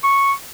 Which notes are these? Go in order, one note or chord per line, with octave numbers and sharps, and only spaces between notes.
C#6